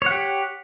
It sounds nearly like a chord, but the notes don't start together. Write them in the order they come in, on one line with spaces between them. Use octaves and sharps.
C#5 F#5 G4